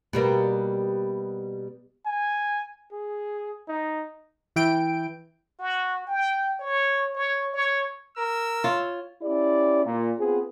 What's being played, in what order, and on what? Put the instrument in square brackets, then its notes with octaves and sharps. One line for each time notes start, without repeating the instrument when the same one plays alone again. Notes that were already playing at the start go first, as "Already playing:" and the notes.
[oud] B2 G3 A#3
[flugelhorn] G#5
G#4
D#4
[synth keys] E3 G5 D7
[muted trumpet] F#4
G5
C#5
C#5
C#5
[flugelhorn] A#4 [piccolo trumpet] E6
[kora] F4 C#5
[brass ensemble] C#4 E4 G4 D5
A#2
B3 C4 F4 G#4